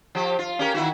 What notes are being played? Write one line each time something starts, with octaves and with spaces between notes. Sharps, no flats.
F3 G4
F4
C#4 G4 A#4
D#3 E4 F#4